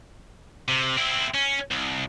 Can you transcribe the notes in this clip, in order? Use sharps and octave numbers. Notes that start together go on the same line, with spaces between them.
C3
C4 E4
C#4
C2